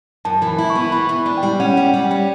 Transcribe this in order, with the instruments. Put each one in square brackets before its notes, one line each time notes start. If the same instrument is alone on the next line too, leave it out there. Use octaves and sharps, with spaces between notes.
[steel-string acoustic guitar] F#2 [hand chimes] A5
[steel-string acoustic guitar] E3
[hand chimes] B5
[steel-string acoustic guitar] E4
[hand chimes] B5
C#6
[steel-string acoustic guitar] B3
[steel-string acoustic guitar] E3 [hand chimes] B5
[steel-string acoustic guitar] E3
[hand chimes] B5
[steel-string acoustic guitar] D4
[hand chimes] G5
[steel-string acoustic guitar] G3
[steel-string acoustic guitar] C#4 [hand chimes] F#5
[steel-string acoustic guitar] G3 [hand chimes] F#5
[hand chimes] G5
[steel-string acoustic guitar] G3
[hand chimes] G5
[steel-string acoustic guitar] C#4